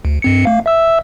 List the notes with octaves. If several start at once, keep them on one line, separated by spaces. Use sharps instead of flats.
D2
G2 C4 C#7
A3 F5
E5 E6